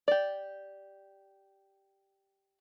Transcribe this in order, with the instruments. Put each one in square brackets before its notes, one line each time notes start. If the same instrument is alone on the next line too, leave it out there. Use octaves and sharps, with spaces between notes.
[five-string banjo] G4 D5